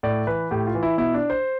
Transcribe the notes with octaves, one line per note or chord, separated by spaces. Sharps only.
A2 D5
E3 B4
A2 G4
F4
E3
E4
B2 E4
D4
C5